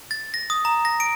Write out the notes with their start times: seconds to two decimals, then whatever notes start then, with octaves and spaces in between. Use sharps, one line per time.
0.11 A6
0.34 A#6
0.50 D#6
0.65 A#5
0.85 A#6
1.00 D7